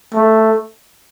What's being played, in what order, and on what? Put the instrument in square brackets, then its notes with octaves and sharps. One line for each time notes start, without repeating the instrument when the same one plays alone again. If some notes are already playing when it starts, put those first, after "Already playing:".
[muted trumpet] A3